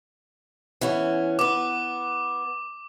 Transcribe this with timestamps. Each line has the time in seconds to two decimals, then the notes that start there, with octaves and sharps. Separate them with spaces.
0.81 E3 B3 C#4
1.39 B3 B4 D6